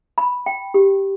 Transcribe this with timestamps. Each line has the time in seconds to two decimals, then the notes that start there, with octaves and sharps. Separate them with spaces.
0.18 B5
0.46 G5
0.74 G4